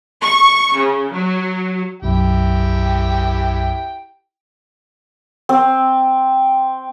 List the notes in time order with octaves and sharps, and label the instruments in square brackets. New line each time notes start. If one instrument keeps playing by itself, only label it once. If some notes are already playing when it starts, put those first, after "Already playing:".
[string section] C#6
C#3
F#3
[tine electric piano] B1 F#2 [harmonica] E4 G4 G5
[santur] C4